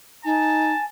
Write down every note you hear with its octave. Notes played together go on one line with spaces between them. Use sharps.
D#4 G#5 A5